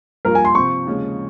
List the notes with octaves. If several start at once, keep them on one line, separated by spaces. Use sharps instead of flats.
G2 F3 A#3 F4 A#4
G#5
C6
C3 F3 C4 C#6
D#2 C#3 F3 G#3 C#4